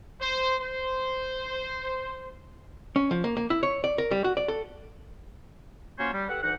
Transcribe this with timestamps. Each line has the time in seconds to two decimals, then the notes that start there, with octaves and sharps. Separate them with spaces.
0.21 C5
0.60 C5
2.96 C#4
3.11 F3
3.24 A#3
3.37 A#3
3.50 E4
3.63 C#5
3.84 D5
3.98 A#4
4.11 G3
4.24 F#4
4.37 D5
4.48 A4
5.99 F#3 A#3 C#4 F4 C5 C#5
6.12 G3
6.29 G4 A4 B4 F#5
6.43 D2 E3 D#4 F#5